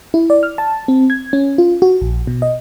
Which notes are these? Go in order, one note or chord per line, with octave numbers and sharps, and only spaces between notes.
E4
D5
F6
A5
C4
G#6
C#4
F4
F#4
A#1
B2
D#5